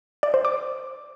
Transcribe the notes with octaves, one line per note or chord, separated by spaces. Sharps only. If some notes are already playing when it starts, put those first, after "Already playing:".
D5
C5
D6